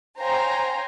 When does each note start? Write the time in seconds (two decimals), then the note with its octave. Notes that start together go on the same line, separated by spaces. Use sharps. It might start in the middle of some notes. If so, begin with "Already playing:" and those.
0.20 C5 C#5 F5 G5 G#5 A#5